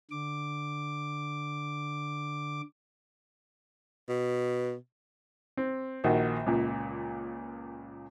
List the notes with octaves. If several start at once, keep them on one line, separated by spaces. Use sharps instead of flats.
D3 D6
B2
C4
A#1 D#3 F#4
C#2 A#2